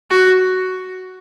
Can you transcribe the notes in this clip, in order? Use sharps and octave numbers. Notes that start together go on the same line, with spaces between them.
F#4